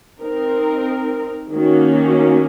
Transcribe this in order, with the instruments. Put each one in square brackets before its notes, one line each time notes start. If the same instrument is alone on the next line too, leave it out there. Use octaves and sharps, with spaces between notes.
[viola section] C4 D#4 A#4
D#3 A#3 C#4 F#4